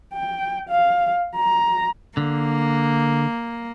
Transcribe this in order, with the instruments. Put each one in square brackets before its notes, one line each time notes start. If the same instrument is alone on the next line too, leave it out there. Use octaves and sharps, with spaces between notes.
[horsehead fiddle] G5
F5
A#5
[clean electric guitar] D3 [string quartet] A#3